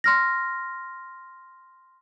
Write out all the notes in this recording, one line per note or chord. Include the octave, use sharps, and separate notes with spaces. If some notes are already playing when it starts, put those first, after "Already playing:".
C6 F6 A#6